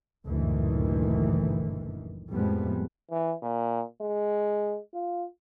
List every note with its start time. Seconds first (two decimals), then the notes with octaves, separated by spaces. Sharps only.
0.25 F#1 D2 G2 A#2 D#3 E3
2.31 F2 A2 F3 G3 G#3 B3
3.11 E3
3.42 A#2
4.02 G#3
4.94 F4